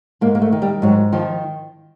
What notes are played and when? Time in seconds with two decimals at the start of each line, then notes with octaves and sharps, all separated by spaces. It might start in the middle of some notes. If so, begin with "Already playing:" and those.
0.21 G#2 A#3
0.35 A#3
0.42 A3
0.52 D#3
0.62 G3
0.82 G#2 F#3
1.12 D#3 F3